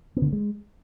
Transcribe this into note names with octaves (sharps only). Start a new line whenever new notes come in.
B3
D3
A#3
G#3